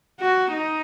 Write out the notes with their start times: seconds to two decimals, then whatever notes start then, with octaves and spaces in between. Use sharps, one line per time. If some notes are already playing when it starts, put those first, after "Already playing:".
0.20 F#4
0.52 D#4